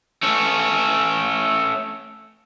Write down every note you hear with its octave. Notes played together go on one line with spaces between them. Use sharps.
A3 C#4